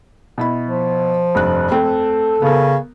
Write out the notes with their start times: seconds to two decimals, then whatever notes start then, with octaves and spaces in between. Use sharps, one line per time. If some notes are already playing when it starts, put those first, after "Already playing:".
0.38 B2 E4 B5
0.68 F3
1.35 F1 G2 F#6
1.71 A3 C4 A4
2.42 C#3 B3 A#4